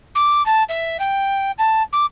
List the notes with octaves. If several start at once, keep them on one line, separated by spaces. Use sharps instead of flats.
D6
A5
E5
G5
A5
D6